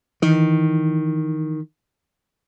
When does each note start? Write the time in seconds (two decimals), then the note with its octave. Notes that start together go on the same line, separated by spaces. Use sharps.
0.22 D#3 E3